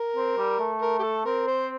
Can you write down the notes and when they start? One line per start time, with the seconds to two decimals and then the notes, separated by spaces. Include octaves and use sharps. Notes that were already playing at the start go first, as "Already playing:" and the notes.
Already playing: A#4
0.16 C4
0.38 G3
0.59 A3
0.81 A#4
0.99 G4
1.03 A4
1.25 C4 A#4
1.48 C5